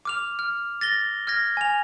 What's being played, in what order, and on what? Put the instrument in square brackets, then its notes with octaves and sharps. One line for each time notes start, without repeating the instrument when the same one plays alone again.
[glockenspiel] D6 F6 F7
F6
A6 A#6 G7
F6 G#6 A#6
G#5 F7